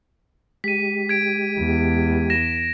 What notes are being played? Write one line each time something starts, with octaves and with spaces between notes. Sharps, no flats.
G#3 G4 B6 D#7
G#6 D7
E2
A#6 E7